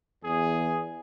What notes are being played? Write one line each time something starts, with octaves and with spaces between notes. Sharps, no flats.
E2 G#4